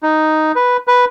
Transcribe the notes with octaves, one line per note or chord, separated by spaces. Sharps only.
D#4
B4
B4